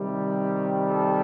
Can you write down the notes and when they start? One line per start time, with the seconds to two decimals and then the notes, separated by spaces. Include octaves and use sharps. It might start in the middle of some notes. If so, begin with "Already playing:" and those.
Already playing: C3 D#3 G3
0.89 A4